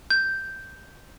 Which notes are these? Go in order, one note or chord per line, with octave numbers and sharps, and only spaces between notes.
G6